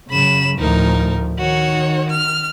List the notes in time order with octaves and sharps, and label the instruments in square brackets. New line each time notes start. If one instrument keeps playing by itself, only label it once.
[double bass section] F#2 C#3 [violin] B5 E7
[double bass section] D2 A2 F3 [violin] D#4 A#4
[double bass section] D#3 [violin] F#4 C#5
[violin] F6